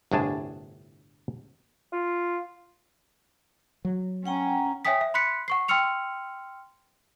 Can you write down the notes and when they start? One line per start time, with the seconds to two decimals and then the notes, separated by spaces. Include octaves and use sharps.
0.12 G1 C2 A2 D4 G#4 A5
1.93 F4
3.85 F#3
4.26 C#4 F#5 G5 A#5
4.85 C#5 E5 G5 G#5 D#6 B6
5.01 E5
5.14 B5 C6 F#6 B6 C#7
5.48 F#5 C#6 C7
5.68 G5 C6 E6 F6 C#7 F7